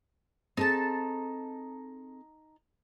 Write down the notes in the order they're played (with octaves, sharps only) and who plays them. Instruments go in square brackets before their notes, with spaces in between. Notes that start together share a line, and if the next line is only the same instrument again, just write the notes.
[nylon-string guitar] C4 G#4 A4 [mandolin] D#4 A5